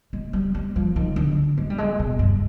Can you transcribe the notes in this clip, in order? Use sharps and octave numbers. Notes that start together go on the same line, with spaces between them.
G#3
G3
G3
F3
D#3
D3
G#3
G3
G#3
B2
G2